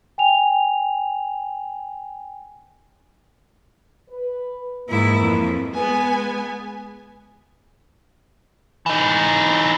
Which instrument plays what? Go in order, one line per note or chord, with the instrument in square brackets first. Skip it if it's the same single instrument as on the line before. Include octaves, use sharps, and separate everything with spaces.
[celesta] G5 G#5 F7
[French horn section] B4
[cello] G#2 E4 [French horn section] E3 A#3
[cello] F2
[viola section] G#3 B3 G#5
[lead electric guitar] E3 D#4